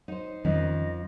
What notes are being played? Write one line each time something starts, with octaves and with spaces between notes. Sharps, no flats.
D#4 C5
F2 D#3 F3 G3 C#4 D#5